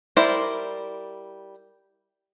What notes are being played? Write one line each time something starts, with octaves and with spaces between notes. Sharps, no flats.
G3 E4 A#4 C5 D5